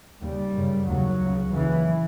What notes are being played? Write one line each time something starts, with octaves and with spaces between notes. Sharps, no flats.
D#2 C#3 G3
F#2 C#3
D#2 C#3 F#3
C#2 C#3
D#2 C#3 E3